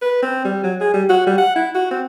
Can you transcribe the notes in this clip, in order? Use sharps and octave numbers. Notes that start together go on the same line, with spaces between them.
B4
C4
G3
F#3
G#4
G3
F#4
G3
F#5
E4
F#4
C4